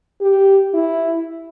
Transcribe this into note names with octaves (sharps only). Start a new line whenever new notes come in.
G4
E4